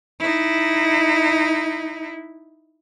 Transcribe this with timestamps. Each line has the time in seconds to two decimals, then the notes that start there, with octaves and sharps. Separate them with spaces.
0.19 D#4 E4